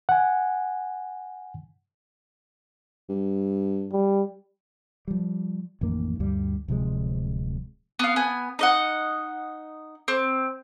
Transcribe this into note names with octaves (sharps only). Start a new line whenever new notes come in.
F#5 G#5
G2
G3
F3 G3
A1 F2 D#3 A#3
D2 G2 G3
D1 C3 F3 G#3
B3 F5
B3 G#5
D#4 D#5 F#5
C4